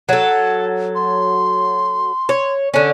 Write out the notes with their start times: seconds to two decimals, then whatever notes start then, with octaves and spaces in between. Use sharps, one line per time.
0.09 F#3 A4 F#5
0.95 C6
2.29 C#5
2.74 D3 C#4